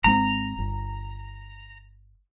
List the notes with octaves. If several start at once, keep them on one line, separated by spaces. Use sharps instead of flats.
G#1 G#3 C4 A#5
G1